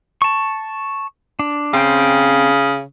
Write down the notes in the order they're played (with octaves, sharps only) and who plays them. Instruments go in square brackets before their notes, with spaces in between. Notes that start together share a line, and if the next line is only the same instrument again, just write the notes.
[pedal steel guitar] A5 C#6
D4
[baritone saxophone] C#3 [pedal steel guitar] C4 C5 G5